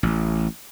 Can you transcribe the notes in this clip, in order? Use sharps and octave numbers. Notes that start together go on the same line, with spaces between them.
A1